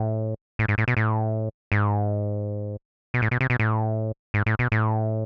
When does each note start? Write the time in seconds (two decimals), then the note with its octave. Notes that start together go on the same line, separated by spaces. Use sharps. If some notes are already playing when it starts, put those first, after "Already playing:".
Already playing: A2
0.59 A2
0.68 G#2
0.78 A2
0.88 B2
0.97 A2
1.72 G#2
3.14 B2
3.22 A2
3.31 B2
3.41 C3
3.50 B2
3.59 A2
4.34 G#2
4.46 A2
4.59 B2
4.72 A2